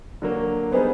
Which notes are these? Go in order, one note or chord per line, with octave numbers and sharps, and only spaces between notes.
D3 F#3 A#3
G3 B3 D#4 G#4 C5